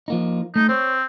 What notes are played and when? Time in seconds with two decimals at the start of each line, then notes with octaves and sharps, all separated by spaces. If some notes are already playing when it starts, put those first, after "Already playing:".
0.08 F3 A#3 D#4
0.56 A3 D#4
0.69 C4 C5 C#5